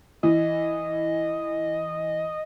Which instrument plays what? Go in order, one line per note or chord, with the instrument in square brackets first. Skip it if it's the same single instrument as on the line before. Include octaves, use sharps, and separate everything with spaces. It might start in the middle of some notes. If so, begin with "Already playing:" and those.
[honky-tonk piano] E3 [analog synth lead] D#5